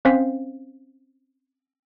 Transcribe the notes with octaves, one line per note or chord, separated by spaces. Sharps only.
C4 C#4 C5 F5 B6